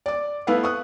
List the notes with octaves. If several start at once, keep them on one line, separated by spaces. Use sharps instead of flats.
D5 D6
A3 B3 E4 B4 F5 F#5
C#6 D#6 F#6